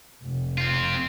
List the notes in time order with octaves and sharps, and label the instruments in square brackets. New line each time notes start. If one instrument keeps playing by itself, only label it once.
[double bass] F1
[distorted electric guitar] C4 F4